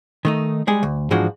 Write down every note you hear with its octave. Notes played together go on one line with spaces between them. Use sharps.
D#3 A3 D#4
G3 G#3 G#4
D2
G#2 E3 F3 G#3 D4 F#4